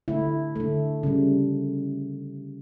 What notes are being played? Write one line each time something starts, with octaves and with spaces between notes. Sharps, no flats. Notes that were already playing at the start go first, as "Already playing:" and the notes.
D3 A3 E4
D3 A3
C#3 G3